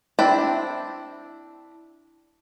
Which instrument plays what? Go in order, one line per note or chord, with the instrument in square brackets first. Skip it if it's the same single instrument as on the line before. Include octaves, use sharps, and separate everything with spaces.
[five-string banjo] C4 D4 E4 G5